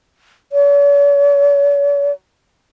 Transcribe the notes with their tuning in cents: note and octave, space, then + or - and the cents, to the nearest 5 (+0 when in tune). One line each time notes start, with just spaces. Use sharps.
C#5 +45